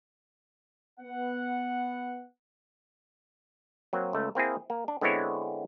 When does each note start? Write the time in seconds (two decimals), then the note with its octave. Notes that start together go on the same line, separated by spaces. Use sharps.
1.00 B3 F#5
3.93 F#3 A#3 C4
4.13 C#2 A3
4.35 A#3 C4 E4 G#4
4.70 A#3
4.88 D4
5.01 D3 G#3 B3 C4 E4 C#5